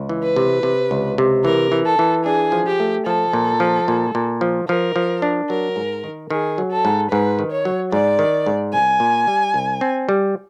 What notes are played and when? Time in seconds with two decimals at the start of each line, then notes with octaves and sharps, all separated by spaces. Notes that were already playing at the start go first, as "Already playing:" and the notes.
Already playing: C#2
0.09 E3
0.23 B4
0.36 C3
0.63 C3
0.91 C#2
1.18 C3
1.44 E3 A#4
1.72 E3
1.86 A4
1.99 E3
2.26 D4 G#4
2.52 F3
2.67 G4
2.80 A3
3.06 F3 A4
3.33 A#2
3.60 F3
3.88 A#2
4.15 A#2
4.41 F3
4.69 F3 A#4
4.96 F3
5.22 D4
5.49 F#3 A#4
5.76 G#2
6.04 D#3
6.30 D#3 G#4
6.58 F#3
6.71 A4
6.85 G#2
7.11 G#2 B4
7.39 D#3
7.52 C#5
7.65 F#3
7.92 G#2 D5
8.19 D#3
8.46 G#2
8.73 C2 G#5
9.00 A#2
9.27 G3
9.54 C2
9.81 C4
10.09 G3